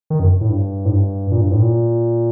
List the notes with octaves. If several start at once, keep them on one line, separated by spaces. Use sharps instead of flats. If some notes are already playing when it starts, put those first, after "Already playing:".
D#3
F#2
A2
G2
A2
G2
A#2
G2
A2
A#2